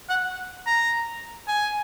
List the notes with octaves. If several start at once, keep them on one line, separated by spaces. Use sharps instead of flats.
F#5
A#5
G#5